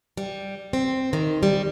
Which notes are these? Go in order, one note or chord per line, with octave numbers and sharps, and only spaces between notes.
G3
C4
D#3
G3